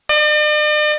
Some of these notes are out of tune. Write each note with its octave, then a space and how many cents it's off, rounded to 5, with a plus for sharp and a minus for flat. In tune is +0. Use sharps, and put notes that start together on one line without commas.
D5 +45